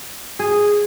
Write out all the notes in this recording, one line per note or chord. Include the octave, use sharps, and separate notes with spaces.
G#4